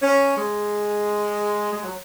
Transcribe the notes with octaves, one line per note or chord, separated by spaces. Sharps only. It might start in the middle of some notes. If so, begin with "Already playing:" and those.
C#4
G#3
G#3
F#3